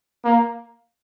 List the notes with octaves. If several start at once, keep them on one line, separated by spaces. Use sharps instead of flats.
A#3